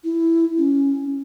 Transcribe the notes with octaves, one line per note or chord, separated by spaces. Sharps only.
E4
C#4